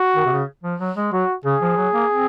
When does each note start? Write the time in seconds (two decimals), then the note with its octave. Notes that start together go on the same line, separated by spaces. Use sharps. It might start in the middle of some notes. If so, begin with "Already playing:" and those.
Already playing: F#4
0.16 D#3
0.25 C3
0.32 C#3
0.64 F3
0.80 F#3
0.96 G#3
1.12 F#3 F#4
1.45 C#3 G#4
1.61 F3
1.77 F#3
1.93 A#3
2.10 C4